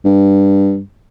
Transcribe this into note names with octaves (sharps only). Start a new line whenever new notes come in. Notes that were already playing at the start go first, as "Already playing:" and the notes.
G2